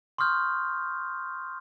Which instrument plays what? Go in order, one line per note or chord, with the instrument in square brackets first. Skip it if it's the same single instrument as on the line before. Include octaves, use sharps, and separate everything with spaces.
[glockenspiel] C6 C#6 D#6 F6 G6